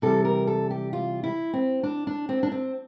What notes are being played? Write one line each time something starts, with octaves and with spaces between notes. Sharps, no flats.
C3 E3 G3 A4
A#4
A4
G4
F4
E4
C4
D4
D4
C4
D4
C4